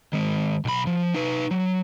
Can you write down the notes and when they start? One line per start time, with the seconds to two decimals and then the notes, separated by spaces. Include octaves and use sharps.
0.13 D#3 G#3
0.65 B1 B5
0.87 F3
1.14 D#4 B4
1.51 F#3